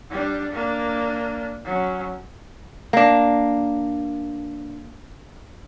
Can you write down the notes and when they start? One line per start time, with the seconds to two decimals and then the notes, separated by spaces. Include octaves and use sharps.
0.10 G3 D4
0.51 A#3 D4
1.64 F#3 C#4
2.93 A#3 D4